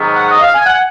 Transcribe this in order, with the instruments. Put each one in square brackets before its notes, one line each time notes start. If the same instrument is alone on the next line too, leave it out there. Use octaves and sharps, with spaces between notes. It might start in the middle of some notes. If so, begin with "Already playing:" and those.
Already playing: [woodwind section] G#2 D#3 F#3 B3
F#5
D#5
F5
G#5
F#5